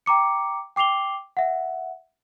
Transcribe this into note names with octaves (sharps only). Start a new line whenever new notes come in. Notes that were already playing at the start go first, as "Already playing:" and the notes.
G5 A#5 D6 C#7
G5 D6 C7 F7 G7
E5 F#5